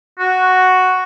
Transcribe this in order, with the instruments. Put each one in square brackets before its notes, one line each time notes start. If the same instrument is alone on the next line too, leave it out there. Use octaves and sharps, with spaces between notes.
[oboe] F#4